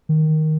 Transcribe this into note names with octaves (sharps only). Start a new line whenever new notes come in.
D#3